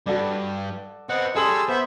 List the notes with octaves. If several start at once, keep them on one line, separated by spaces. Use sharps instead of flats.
G2 F#4 A4 D5
B3 C4 D#5 F#5
G3 G#4 A4 C6 D#6 E6 F#7
B3 C5 E5 B5